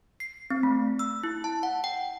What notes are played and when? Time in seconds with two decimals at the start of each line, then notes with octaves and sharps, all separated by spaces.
0.20 C7
0.50 C4
0.63 A3
0.99 E6
1.23 E4
1.44 A5
1.63 F#5
1.84 G5